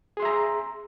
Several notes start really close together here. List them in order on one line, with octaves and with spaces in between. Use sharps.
G#4 C6 E5 A#5